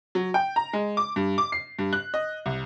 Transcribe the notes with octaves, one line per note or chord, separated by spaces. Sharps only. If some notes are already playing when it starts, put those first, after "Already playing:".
F#3
G5
A#5
G#3
D6
G2
D6
C7
G2
F#6
D#5
C2